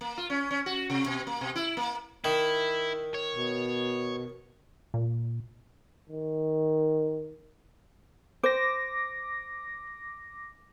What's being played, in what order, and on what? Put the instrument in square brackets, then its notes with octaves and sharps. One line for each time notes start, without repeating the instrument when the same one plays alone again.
[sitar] A#3
F4
C#4
C#4
F#4
C3
B2
A#3
B2
E4
A#3
[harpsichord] D#3 [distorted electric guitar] E4
[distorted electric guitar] C#5
[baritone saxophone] B2
[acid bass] A#2
[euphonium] D#3
[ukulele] C5 [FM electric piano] D6 A#6